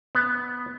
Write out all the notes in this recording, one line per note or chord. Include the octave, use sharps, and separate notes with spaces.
B3